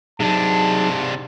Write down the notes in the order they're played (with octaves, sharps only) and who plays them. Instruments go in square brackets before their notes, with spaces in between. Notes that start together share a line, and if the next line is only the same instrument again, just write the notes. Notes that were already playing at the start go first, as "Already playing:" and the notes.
[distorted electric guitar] C3 D4 [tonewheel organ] F#3 D#4 G#4 [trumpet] A5